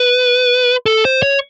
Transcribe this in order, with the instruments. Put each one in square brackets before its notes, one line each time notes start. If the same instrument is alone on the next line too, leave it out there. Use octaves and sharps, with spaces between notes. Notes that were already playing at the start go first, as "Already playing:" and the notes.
Already playing: [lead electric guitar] B4
A4
C5
C#5